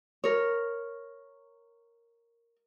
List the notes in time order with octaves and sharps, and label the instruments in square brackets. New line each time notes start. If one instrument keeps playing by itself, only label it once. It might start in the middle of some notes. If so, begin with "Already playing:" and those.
[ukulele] A#4 C#5